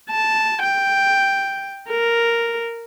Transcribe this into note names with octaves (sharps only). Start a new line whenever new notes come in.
A5
G5
A#4